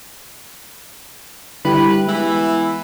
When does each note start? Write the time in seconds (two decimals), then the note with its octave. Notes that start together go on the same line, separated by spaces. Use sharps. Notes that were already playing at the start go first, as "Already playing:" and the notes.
1.65 D3 G3 E4 G4 B4
2.07 E3 G#3 B3 E4